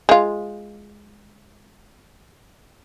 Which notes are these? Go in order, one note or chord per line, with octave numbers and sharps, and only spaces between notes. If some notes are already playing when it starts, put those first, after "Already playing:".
G#3 F4